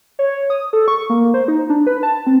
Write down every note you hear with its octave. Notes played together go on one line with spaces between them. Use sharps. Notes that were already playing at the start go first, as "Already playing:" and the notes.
C#5
D#6
A4
C#6
A#3
C5
D#4
D4
B4
A5
C4